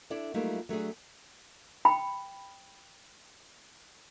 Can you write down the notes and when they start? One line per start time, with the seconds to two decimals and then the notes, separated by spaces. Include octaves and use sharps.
0.10 D4 E4 A4 D5
0.34 F#3 G3 A3 A#3 D#4 F4
0.69 F#3 A3 D4 G#4
1.85 G5 B5